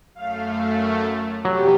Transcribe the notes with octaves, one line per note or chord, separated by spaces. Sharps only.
F#2 A3 F5
C3 F#3 G3 B3 G4